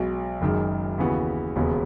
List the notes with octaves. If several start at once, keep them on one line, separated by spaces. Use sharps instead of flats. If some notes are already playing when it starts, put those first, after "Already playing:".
Already playing: B1 B2 G#3
F#1 F#2 D#3 G#3
D#2 C#3 E3 B3 F#4
E1 D#2 C#3 G#3 B3